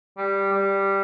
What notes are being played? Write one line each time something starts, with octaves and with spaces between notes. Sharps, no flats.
G3
G3